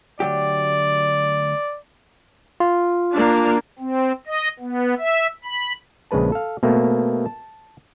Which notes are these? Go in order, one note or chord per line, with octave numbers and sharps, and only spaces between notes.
D2 F#3 G4 D5
F4
A#3 D4
C4
D#5
B3
E5
B5
A#1 C#3 G#3 B4 A5
A4 F5
B2 A3 A#3 C4
A5